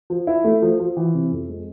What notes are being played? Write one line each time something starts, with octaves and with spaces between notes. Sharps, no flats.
F3
E4
A3
F3
F3
E3
C3
F2
G#3